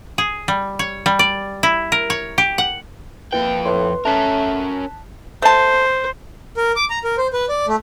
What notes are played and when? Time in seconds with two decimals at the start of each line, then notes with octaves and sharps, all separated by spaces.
0.18 G#4
0.48 G3
0.79 C#5
1.06 G3
1.19 D5
1.63 E4
1.92 A#4
2.10 C#5
2.38 G4
2.58 F#5
3.33 F2 A#3 E4 B4 G5
3.65 A2 B4 C6
4.05 A3 C#4 A#4 A5 F#6 B6
5.42 A3 C5 A5
6.57 A#4
6.76 D6
6.90 A#5
7.04 A#4
7.18 C5
7.33 B4
7.49 D5
7.68 A3